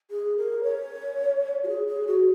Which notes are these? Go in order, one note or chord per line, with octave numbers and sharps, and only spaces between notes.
G#4
A#4
C#5
F#4
G#4
G#4
F#4